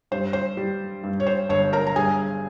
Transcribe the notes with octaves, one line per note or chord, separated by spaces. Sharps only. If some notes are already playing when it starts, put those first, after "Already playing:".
G2 C5
C5
G3
G2
C#5
C5
G1 C#5
A#4 A#5
A#5
G2 G#4 G#5